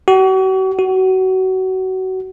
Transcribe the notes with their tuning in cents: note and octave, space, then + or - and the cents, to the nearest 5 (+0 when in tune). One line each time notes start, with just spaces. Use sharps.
F#4 +40
F#4 +25